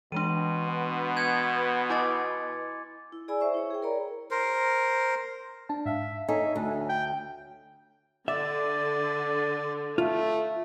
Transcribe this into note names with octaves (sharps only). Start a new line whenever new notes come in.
B2 E3 G#3 D4 C6 D#7
B3
G6 G#6 C#7
E4 B4 D#5 G#5 D6 A6
E4
G#4 D5 G#5 B5 E6
C5 E5 C#6
E4 C#5
G#4 G5
A#4 C#5 D5 A#5 B5
A#4 C5
D4 A5
G#2 E5 F5
D#4 A4 C#5 E5 G#5
D2 D4
G5
D3 D5 E5
A3 F4